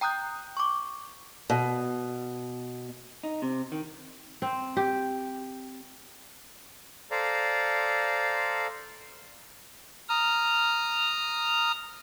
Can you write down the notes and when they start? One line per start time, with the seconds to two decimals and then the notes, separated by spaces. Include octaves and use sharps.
0.01 G5 A#5 D#6 F#6 G6
0.57 C#6 D6
1.50 B2
3.23 D#4
3.42 C3
3.72 D#3
4.42 C4
4.77 G4
7.11 A4 C5 D5 F5 A#5
10.09 A#5 D#6 F6